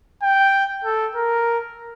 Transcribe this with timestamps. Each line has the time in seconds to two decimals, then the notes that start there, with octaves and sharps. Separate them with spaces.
0.23 G5
0.85 A4
1.15 A#4